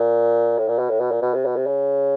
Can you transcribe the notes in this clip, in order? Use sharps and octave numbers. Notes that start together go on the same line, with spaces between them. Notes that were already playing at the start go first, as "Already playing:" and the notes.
Already playing: A#2
A2
A#2
B2
A2
B2
A#2
B2
C3
B2
C3
C#3